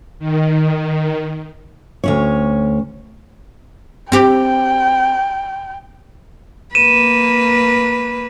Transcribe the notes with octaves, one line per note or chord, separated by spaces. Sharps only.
D#3
D2 C#4 C#5
C4 G4 G5
A#3 B4 D#7 E7